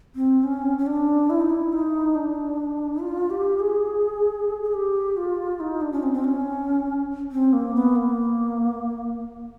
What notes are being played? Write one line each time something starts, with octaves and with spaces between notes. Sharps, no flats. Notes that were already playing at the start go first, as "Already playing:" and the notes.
C4
C#4
C#4
D4
E4
D#4
E4
D#4
D4
F4
G4
G#4
G#4
G4
F4
D#4
D4
C#4
C4
C4
C#4
C4
A#3
B3
A#3